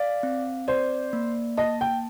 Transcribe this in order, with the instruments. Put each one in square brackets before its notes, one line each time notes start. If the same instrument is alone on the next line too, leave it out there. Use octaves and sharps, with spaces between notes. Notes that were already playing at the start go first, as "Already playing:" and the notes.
Already playing: [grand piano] D5 [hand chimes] F5
[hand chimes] C4
[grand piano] C5 [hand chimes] D5
[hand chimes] A#3
[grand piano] D#5 [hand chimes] A5
[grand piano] G5